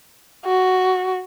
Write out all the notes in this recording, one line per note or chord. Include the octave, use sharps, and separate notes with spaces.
F#4